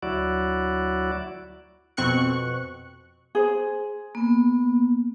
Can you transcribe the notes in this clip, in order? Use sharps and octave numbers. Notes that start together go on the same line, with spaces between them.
D2 F#3 E4 F#4 D5
F2 B2 C4 C#6 F#6 C#7
G#4 C5
A#3 B3